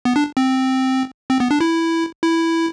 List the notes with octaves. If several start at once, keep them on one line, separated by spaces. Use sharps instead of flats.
B3
D4
C4
C4
B3
D4
E4
E4